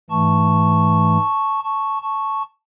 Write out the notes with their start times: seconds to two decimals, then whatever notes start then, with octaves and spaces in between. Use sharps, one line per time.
0.10 G#2 E3 A3 A5 C#6
1.64 A5 C#6
2.02 A5 C#6